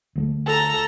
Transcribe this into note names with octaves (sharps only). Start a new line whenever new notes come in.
D2 G#3 A3
A4 A#5